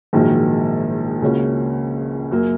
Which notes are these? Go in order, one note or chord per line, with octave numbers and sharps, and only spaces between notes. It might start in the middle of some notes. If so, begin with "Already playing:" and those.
A#1 G#2 D#3 F#3 A#3
C#2 C#3 A#3 C#4 F#4
F#2 F#3 A#3